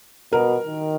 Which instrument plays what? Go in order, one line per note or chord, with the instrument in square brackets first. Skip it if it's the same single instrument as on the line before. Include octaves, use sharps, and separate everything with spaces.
[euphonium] B2 [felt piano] A#4
[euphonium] D#3